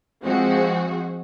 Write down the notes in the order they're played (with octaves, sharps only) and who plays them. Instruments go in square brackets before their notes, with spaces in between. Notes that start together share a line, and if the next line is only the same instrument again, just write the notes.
[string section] F3 G#3 C4 F#4